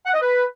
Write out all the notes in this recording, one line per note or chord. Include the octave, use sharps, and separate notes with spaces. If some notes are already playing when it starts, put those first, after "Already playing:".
F#5
D#5
B4